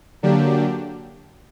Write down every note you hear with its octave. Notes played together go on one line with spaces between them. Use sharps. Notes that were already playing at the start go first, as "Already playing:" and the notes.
D3 F#3 A#3 D4 G4